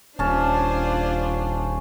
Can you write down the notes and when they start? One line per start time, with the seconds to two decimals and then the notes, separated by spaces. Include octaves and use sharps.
0.19 D#1 C#4 D4 F4 C5 A5